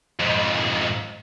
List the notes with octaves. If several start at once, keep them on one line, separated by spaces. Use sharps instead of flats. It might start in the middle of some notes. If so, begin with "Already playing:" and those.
F2 G#2